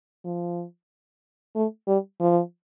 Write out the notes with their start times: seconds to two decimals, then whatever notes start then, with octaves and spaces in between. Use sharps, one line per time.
0.25 F3
1.55 A3
1.87 G3
2.21 F3